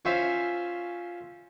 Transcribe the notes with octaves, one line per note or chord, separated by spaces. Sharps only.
C#4 F4 C5 E5 F5 G#5